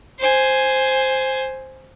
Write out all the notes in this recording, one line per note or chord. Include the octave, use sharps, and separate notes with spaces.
C5 G#5